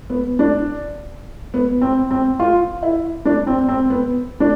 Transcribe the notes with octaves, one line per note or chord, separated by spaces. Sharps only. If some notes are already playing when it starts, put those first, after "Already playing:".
B3
D4
B3
C4
C4
F4
E4
D4
C4
C4
B3
D4